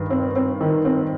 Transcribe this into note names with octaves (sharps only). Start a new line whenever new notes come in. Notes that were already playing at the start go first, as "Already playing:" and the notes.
Already playing: G2 D#3
C4
C4
D#3
C4